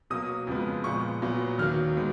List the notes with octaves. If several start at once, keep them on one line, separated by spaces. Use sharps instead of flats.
B2 F#3 A#3 D#6
F2 C#3 F3 G#3 B3
A#2 F3 G#3 B3 C#6
A#2 F#3 B3
D#2 D#3 F#3 A#3 F6
D#3 G#3 B3